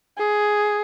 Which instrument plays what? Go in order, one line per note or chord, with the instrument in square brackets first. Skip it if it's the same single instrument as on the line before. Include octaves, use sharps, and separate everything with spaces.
[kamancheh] G#4